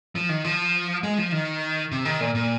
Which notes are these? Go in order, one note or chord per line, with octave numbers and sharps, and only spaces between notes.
F3
D#3
F3
G#3
F3
D#3
C3
D#3
A#2
A#2